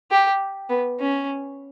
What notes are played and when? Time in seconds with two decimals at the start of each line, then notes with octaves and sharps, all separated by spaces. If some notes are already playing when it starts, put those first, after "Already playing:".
0.11 G4
0.69 B3
1.00 C#4